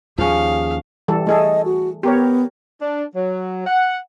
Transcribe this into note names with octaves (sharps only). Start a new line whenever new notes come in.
D#2 F3 C#4 G#4 F5
E3 G3 A4
A3 G#4 A4 D#5
F#4
B3 G4 A#4 C#5
D4
F#3
F#5